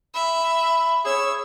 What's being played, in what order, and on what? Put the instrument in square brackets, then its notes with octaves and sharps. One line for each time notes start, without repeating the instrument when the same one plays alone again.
[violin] E5 [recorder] B5
[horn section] G#4 C#5 [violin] E6